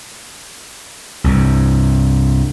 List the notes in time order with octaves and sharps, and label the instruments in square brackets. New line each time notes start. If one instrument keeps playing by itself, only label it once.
[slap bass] C2 G2